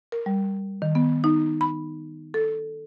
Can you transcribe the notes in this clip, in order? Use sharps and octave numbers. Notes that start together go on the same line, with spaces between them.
A#4
G3
D#3
B3
D#4
B5
A4